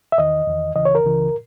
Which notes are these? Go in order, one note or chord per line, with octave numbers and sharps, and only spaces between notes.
E5
E2 D#3 D#5
E2 D#3
C#2 C#3 E3 D#5
C#5
A#4
C#2 C#3 E3